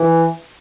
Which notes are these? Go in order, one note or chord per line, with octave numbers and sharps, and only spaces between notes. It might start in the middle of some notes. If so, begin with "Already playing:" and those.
Already playing: E3